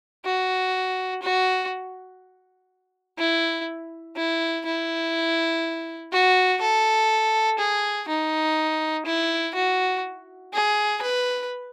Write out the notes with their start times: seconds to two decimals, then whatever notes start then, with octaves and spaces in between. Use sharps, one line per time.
0.25 F#4
1.22 F#4
3.18 E4
4.16 E4
4.66 E4
6.12 F#4
6.61 A4
7.59 G#4
8.08 D#4
9.06 E4
9.55 F#4
10.53 G#4
11.02 B4